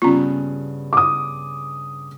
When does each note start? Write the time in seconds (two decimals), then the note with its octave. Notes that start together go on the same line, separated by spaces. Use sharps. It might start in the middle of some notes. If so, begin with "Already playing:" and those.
0.02 G2 C#3 B3 C#4 F4
0.93 D6 D#6